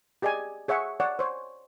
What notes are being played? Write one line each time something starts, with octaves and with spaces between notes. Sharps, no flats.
G4 G#4 D5 D#5 G#5
G#4 C#5 E5 F#5 C#6
C#5 D5 F#5
C5 C#5